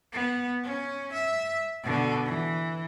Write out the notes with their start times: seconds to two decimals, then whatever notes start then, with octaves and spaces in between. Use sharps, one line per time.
0.13 B3
0.63 C#4
1.12 E5
1.83 B2 D3
2.25 E3